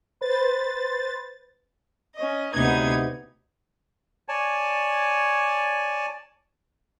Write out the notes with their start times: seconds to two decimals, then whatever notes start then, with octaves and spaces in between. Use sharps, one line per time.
0.21 B4 C5 A6
2.15 C#4 D#5
2.52 D2 C3 B3 D#4 B4 G#6
4.29 C#5 D5 G#5 A5